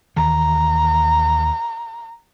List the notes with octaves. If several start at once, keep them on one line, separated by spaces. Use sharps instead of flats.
D#2 D#3 E3 A#5